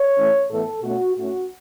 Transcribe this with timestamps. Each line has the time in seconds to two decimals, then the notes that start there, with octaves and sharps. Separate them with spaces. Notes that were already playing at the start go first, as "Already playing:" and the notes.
Already playing: C#5
0.16 E3 A3 C#4
0.50 A2 E3 B3 A4
0.82 B2 A3 C#4 F#4
1.15 A2 A3 C#4 F#4